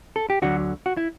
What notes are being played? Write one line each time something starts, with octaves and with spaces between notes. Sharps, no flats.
A4
G4
D2 D3 F#3 F#4
F#4
E4